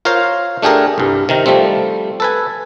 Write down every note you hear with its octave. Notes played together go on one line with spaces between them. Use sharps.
F4 A#4 C5 C#5 F5
A3 D4 G4 G#4 A#4
C2 G2
C3 D#3 A#4
F3 G3 A3 C4
A4 B4 G#5